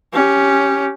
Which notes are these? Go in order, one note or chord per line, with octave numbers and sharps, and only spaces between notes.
C#4 G4